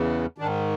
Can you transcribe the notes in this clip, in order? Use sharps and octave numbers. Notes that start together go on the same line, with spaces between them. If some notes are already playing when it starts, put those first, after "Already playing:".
Already playing: E2 C#3 E3
G#2 D#3 D4